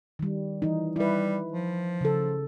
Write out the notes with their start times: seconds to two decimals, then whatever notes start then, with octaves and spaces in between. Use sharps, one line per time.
0.19 D#3 G3
0.62 E3 D#4
0.96 G3 E4 B4
1.53 F3
2.01 C#3 A4